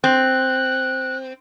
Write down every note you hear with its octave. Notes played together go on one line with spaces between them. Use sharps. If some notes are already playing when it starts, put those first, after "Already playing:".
C4 F#6